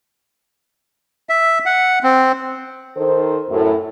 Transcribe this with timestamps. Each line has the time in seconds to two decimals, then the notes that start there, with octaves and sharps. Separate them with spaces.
1.29 E5
1.66 F#5
2.03 C4
2.97 D#3 D#4 A4 C5
3.50 F#2 A2